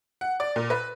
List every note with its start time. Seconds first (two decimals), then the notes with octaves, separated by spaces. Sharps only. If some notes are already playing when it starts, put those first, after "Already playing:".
0.21 F#5
0.40 D5
0.56 A#2
0.70 B4